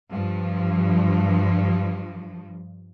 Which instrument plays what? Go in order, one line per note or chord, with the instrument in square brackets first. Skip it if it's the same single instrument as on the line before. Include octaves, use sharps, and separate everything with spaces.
[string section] G2 F3